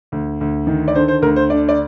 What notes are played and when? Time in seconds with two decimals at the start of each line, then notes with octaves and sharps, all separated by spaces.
0.12 D2
0.41 D2
0.67 D#3
0.88 D5
0.95 D3 C5
1.08 C5
1.22 D2 A#4
1.36 C5
1.50 D3 D5
1.69 D5